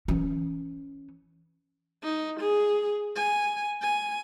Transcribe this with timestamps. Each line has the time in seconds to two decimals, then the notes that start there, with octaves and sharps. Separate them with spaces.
0.08 E3 C#4
2.03 D#4
2.40 G#4
3.16 G#5
3.82 G#5